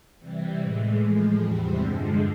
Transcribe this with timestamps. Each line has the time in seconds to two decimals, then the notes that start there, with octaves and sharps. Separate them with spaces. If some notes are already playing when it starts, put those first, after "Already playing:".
0.19 C3 E3 G3
0.60 A2 E3 G#3
1.00 A2 F3 G#3
1.39 E2 C3 E3 G3 C4
1.79 G2 D3 F3 G#3